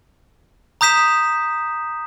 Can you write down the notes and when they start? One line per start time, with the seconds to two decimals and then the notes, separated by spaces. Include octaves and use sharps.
0.81 A#5 D#6 G6 B6 E7